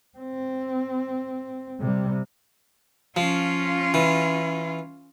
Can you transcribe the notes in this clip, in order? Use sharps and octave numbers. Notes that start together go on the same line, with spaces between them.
C4
C3 G3
F3 C#4 F4
E3